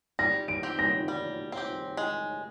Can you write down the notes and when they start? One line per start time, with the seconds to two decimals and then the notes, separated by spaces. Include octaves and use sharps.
0.19 G3 A#6
0.48 D7
0.63 C4 G4
0.79 A#6
1.08 G3
1.52 C4 G4
1.97 G#3